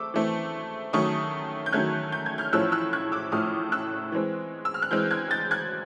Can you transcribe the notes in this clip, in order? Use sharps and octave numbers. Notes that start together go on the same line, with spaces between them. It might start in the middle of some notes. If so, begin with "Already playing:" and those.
Already playing: A3 C4 D6 E6
E3 A3 C4
D#3 F#3 A3 C#4 C#6 D#6
G6
D#3 F#3 A3 C#4 F#6 G#6
G6
G#6
F6 G6
A2 F3 A3 C#4 E6 F#6
E6 F#6
F#6 G#6
D6 E6
A2 F3 A3 C#4 D#6 F6
E6 F#6
E3 G#3 C4
E6
F6
F#6
E3 G#3 C4 F6 G6
F#6 G#6
G6 A6
F#6 G#6